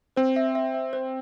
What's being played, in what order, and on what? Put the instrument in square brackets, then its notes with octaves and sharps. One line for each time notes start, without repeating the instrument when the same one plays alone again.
[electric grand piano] C4 [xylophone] C5
[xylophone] E5
E5
E5
C5